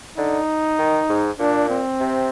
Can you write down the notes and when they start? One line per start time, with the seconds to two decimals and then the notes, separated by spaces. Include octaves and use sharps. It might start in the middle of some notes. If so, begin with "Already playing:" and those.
0.18 D3 D#4
0.79 D#3
1.09 G#2
1.39 A#2 D4
1.70 C4
2.00 C3